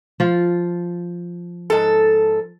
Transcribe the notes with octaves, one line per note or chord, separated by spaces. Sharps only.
F3 F4
G#2 A4